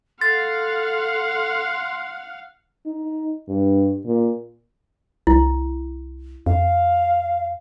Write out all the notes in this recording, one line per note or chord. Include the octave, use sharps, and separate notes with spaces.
A4 F5 F#5 C6 A6
D#4
G2
A#2
C2 E4
F2 F5